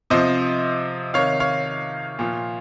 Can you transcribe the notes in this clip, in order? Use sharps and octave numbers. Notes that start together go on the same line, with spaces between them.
C3 F3 C5 D#5
C3 D#3 C#5 F5
C#5 F5
A#2 F3